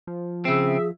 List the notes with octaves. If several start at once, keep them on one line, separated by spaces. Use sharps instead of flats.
F3
C#3 C4 G#4 E5